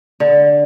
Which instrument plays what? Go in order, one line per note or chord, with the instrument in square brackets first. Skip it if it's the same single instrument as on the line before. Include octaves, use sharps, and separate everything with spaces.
[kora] D3